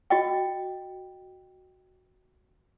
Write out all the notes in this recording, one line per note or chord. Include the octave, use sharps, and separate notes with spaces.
F#4 D#5 G5